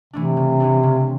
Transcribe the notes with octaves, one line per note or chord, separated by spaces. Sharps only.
C3 E3 A3 D4
C#3
E3 A3 D4
C#3